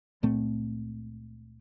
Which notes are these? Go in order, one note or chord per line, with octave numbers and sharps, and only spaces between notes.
C#2 A#2 A3 C4